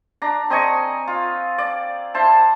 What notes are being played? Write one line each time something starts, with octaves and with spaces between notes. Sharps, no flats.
D4 A#5
C4 D#5 G#5 C#6
F4
D5
E4 C5 A5